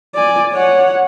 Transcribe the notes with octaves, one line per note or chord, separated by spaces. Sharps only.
D5 G#5
C#5 F#5